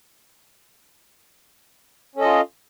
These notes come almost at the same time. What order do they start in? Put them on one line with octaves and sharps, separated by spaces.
C#4 A4 D#5 F4